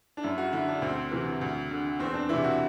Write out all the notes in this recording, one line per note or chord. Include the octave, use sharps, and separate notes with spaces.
D4
F#2 E4
F#4
D3 E4
D4
D2 C4
C3 E3
D2
D3
E2 C4
D4
C3 E3 E4
F#4